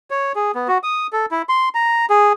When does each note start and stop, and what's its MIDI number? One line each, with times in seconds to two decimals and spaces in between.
0.11 0.32 73
0.35 0.52 68
0.55 0.68 59
0.68 0.78 66
0.83 1.07 87
1.13 1.26 69
1.31 1.42 64
1.49 1.69 84
1.75 2.06 82
2.10 2.33 68